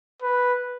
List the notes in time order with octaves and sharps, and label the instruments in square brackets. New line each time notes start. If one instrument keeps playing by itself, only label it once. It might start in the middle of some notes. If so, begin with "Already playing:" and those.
[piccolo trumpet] B4